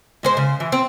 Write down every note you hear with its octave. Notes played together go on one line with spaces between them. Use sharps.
G#2 G#3 C5
C#3
E3
C4